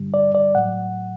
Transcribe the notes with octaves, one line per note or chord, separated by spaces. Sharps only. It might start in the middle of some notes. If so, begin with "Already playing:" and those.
Already playing: G2 D3 G3
D5
D5
A2 F#3 F#5